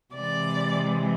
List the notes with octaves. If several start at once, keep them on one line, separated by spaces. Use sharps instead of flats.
C3 E3 G#3 D5